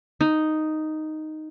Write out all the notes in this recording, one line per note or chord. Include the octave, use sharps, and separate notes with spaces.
D#4